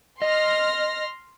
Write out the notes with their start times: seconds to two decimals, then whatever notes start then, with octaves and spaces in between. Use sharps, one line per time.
0.22 D#5 C6 F6 A#6